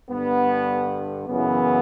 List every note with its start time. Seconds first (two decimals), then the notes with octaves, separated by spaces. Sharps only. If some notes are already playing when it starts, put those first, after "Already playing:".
0.10 G2 D3 B3
1.27 F#2 C#3 E3 B3